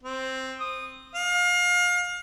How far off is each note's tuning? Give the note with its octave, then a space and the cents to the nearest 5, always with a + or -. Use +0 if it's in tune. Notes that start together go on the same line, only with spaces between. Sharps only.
C4 +5
D#6 -20
F5 +30